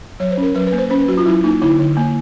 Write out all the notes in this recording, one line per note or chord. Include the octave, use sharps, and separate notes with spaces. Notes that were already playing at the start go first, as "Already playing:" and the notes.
F#3 C#5
C5
C#4
A#4
F#3 B4
B4
A#3
C5
C#4 C5
B4
F#3 F#4
F4
F#3 E4
A#3 D#4
D3 E4
D3
A#3